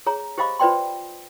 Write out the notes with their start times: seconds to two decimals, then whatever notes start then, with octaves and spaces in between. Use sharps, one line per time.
0.06 G#4 C#5 A#5
0.38 G4 C5 D#5 F5 B5 D6
0.59 F4 B4 C5 D5 G5 C6